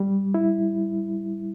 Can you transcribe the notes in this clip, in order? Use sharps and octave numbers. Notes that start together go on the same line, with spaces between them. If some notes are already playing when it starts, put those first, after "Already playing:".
Already playing: G3
E4